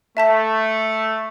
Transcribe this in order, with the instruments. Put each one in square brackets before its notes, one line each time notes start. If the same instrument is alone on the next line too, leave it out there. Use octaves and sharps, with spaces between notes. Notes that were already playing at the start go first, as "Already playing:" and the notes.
[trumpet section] A3 [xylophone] E5 A5 B6